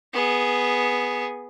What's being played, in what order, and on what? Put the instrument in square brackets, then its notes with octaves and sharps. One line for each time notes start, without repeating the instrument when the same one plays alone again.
[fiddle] B3 G#4